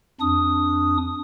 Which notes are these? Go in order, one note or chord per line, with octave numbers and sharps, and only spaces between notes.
F2 D4 D#6